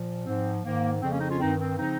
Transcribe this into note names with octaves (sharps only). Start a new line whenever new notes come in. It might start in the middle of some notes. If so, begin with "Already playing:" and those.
Already playing: A#2 F3
G#2 F3 C4
G#2 D#3 A#3
F2 C#3 F3 C4
A#3 C#4
C4 D#4
C#4 F4
G2 D#3 C4 D#4
C4
C#3 F3 C4 D#4